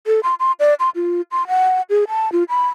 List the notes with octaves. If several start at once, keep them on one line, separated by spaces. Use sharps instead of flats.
A4
C6
C6
D5
C6
F4
C6
F#5
G#4
A5
F4
B5